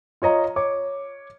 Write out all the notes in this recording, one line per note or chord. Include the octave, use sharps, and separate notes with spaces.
F4 C#5 D#5 A#5
C#5 D6